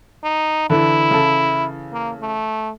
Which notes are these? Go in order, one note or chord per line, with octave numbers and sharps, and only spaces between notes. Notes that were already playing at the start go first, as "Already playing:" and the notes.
D#4
D3 E3 E4
C#3 E3 A4
A#3
A3